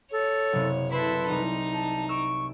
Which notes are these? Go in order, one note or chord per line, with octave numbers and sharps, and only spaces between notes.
A4 C#5
F#1 C3
E4 A4 B4 B5 C6
C2 D#4
A5
C#6 E6 D7 E7